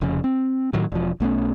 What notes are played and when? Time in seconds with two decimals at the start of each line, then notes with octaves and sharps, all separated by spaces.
0.01 F1 F2 C#3
0.24 C4
0.73 A2 D#3 F#3
0.92 E1 F3
1.20 B1 A3 B3 C#4